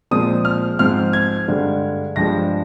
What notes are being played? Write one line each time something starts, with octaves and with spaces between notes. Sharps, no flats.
A#2 F3 G#3 C4 D#6
F6
G#2 F3 G#3 C4 F6
G#6
G2 D3 G#3
G2 F3 G#3 A#6